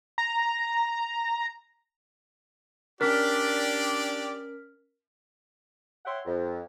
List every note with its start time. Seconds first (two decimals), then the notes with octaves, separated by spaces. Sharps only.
0.18 A#5
3.01 C#4 D4 G4 A#4 D5 F6 B6
6.05 C#5 E5 F#5 G5 C6
6.26 F2